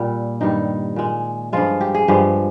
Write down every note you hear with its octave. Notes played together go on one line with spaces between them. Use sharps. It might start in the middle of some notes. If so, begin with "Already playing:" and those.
Already playing: A#2 G3
G2 D#3 G3 D#4
A#2 G#3
G2 F3 G#3 F4
G4
G#4
G2 F3 G#3 G4